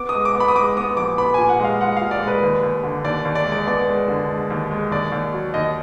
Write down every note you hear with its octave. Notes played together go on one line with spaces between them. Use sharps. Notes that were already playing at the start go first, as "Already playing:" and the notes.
Already playing: B3 D6
D#6
G#3
D6
B3
B5
D#6
G#3 D6
B3 D#6
A#1 D6
B3 B5
A#2 G#5
F#5
G#3 F5
G#3 F#5
A#2 F5
D5
G#3
B4
D#2
D#2
D3
D#2 D5
D#2
D5
G#3
D5
B3 D5
G#3
D3
G#3
D#2
G#3
D#2 D5
D#2
F#3
D#2 D#5